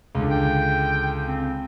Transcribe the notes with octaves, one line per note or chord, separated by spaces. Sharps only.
C#2 D3
G5
C4